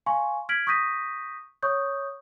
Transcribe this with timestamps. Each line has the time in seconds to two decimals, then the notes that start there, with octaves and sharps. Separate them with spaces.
0.06 F5 G#5 C6 C#6
0.49 F6 G#6 B6 D7 F#7
0.67 C#6 D#6 G6 A#6 B6 D#7
1.62 C#5 C#6 D#6 G6